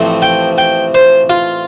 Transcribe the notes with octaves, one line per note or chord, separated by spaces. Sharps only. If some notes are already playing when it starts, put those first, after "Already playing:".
Already playing: A1 A2 F3 A3 C4
G5
G5
C5
F4